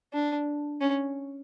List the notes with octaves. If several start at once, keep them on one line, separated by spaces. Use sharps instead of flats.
D4
C#4